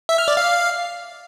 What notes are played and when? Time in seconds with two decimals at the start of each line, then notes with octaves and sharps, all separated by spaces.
0.09 E5
0.18 F6
0.28 D5
0.37 F5